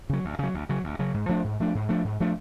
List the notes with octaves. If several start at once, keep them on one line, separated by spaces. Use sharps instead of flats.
C#3 F#3
D2
C#3 F#3
D2
C#3 F#3
D2
C#3 F#3
G#2
F3 A3 D4
G#2
F3 A3 D4
G#2
F3 A3 D4
G#2
F3 A3 D4